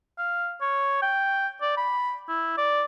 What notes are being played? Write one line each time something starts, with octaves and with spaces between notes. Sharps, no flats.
F5
C#5
G5
D5
B5
E4
D5